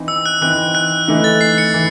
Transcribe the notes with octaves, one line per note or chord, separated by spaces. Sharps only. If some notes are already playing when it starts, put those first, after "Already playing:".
Already playing: E3 C4 D#4
E6
F#6
E3 C4 D#4 F#6
F#6
E3 A3 D#4
A6
C7
C#7
E3